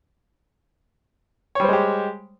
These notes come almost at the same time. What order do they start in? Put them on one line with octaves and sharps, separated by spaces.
C#5 G3 C5 G#3 G4